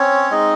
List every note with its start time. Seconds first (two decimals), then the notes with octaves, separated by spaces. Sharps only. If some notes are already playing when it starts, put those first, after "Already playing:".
Already playing: C4 C#4 C#5
0.31 G#3 D#4 D#5